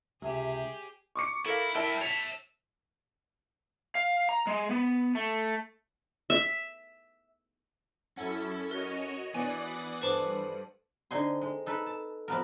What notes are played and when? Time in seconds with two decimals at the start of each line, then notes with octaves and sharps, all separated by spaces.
0.22 C#2 C3 G4 G#4 E5
1.16 C#6 D6 C#7
1.46 E4 A4 A#4 F5
1.75 E4 A#4 B4 E5 G5 A5
2.01 C#5 E5 A5 F7
3.95 F5
4.29 A#5
4.47 G#3
4.71 B3
5.15 A3
6.30 E5
8.17 F#2 C#4 E4 A4 F#5
8.71 F#4 A#4 C#5 D#5
9.34 E3 B3 D4 D5 F#5 G#5 D#6
10.02 G2 A4 B4 C5 A5 D6
11.11 D3 C4 D#4 G#5 C6
11.41 G#3
11.66 D#4 A4 B4
11.86 A5
12.28 F2 B3 A#4